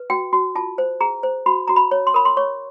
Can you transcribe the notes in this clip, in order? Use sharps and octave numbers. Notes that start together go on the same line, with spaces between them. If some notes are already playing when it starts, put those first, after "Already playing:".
Already playing: B4
F#4 G5
F#4
F4 A5
C5
G#4 A#5
C5
F#4 B5
F#4 A#5
B5
C#5
C6
A#4 B5
C6
C#5 C#6